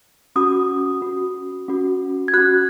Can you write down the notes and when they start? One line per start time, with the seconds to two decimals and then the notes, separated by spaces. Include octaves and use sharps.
0.36 C#4 F#4 D#6
1.01 C#4 F#4
1.68 C#4 F#4
2.28 G#6
2.34 C#4 F#4 F#6